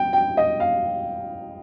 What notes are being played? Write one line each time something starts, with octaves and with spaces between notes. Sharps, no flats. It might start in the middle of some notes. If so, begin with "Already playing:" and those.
Already playing: G5
G5
D#5
F5